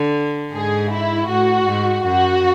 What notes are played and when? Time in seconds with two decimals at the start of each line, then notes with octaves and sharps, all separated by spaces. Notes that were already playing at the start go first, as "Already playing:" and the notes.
Already playing: D3
0.54 G#2 G#4
0.91 E4
1.29 A2 F#4
1.66 G#2
2.05 F#2 F#4